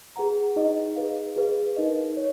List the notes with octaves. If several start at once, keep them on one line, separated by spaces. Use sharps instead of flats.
G#4 B4 F#5 A#5
D#4 G#4 D#5
G#4 B4 F5
G#4 B4 F5
D#4 A#4 D#5
C#5